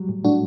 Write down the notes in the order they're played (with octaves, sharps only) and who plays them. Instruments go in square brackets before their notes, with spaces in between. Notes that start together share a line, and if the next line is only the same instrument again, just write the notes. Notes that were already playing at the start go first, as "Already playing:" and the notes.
Already playing: [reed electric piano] F#3 G3
A2
[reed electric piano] A2 [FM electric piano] D4 F#4